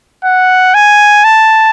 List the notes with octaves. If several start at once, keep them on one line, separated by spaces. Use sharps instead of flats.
F#5
G#5
A5